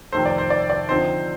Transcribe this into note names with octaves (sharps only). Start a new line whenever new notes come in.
F2 C3 D#3 A3 C5
D5
C5
D5
D5
D3 F3 C4 D#4 C5